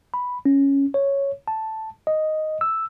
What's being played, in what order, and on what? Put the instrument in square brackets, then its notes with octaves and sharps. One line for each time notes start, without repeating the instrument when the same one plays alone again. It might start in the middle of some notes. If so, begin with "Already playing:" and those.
[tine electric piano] B5
C#4
C#5
A5
D#5
E6